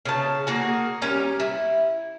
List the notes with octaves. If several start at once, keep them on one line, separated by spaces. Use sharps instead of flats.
C#3 A5
A#3 F#4 G#4
G3 C#4 A#4
E4